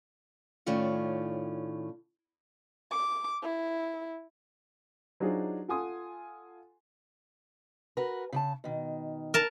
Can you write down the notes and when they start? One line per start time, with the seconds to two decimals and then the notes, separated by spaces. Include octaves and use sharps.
0.66 A2 D#3 C#4 F4 D5
2.91 D6
3.42 E4
5.20 F#3 D4 D#4 F4 G#4 C5
5.68 F4 A4 F#5 G#5 C6 D#6
7.97 F#4 A#4 B4
8.32 C#3 D5 A5
8.64 B2 D#3
9.34 A#4 A5